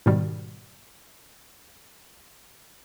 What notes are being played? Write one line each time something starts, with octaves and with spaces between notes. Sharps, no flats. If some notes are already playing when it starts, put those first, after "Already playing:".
G#2 B2 D#3 G3